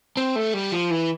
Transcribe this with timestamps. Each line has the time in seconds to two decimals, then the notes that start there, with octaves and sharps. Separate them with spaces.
0.17 C4
0.36 A3
0.54 G3
0.73 F3
0.91 E3